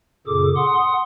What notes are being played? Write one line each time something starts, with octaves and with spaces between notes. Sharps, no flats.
F#2 A#2 C#3 G#4 A4 D6
F#5 C6 D#6